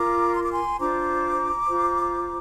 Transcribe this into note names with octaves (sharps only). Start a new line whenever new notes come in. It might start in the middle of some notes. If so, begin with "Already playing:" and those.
Already playing: F4 A#4 A#5 D6
C6
D6
G#5 C6
D4 F4 C5 A#5 D6
F4 C5